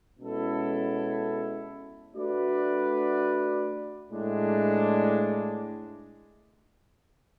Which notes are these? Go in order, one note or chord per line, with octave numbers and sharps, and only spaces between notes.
B2 G#3 C#4 E4 A4
A3 D4 F#4 B4 D5
A2 G#3 D4